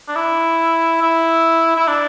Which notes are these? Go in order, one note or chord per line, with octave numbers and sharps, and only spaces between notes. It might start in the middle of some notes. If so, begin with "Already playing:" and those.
D4
E4
E4
E4
D4